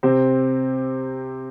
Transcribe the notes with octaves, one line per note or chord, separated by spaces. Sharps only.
C3 C4